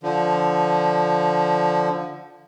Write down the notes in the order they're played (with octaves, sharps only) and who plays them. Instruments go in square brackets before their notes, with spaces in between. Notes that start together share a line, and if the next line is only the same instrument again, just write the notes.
[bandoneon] D3 F3